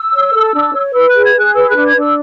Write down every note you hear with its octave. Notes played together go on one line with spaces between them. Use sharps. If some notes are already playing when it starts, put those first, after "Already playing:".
Already playing: E6
C#5
A4
D4
C#5
B4 E6
F#6
G#4
G#6
G#4
F#6
B4 E6
D4 F#6
G#6
D4
E6